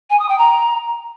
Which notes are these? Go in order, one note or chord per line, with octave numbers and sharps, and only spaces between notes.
G#5
D#6
G5
A#5